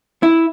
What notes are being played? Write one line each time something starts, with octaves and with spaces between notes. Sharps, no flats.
E4